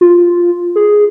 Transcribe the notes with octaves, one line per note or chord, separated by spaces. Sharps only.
F4
G#4